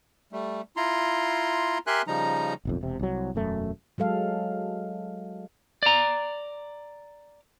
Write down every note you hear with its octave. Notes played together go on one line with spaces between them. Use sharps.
G3 A3
E4 F4 A#5 C6
G4 A#4 E5 G#5 C6 F#6
C#3 F3 G3 D#4 A#5
D1 B1 F2
E1 C3
C2 F#3
E1 F#2 A3
F#3 G#3 A4 F5
D5 A#5